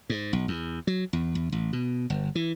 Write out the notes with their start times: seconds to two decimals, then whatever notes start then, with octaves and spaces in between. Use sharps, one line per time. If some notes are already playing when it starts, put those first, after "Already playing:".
0.10 G#2
0.33 B1
0.48 E2
0.87 F#3
1.13 E2
1.35 E2
1.52 A1
1.73 B2
2.10 G1
2.35 E3